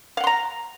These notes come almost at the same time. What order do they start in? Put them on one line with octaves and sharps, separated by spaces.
F5 F#5 C6 A#5